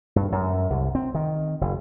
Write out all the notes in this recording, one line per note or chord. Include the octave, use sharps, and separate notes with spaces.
G2
F#2
C2
C4
D#3
F#1